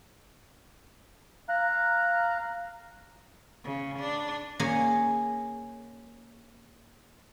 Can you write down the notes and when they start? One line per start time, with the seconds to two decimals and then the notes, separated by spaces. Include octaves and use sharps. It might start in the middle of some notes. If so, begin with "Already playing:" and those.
1.49 F5 A#5 F#6
3.64 C#3
3.99 D4
4.59 A#3 C#4 G#4